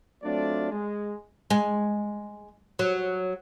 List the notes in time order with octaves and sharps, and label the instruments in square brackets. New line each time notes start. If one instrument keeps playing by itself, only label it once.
[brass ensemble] F#3 A3 C4 D4 F4 D5
G#3
[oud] G#3
F#3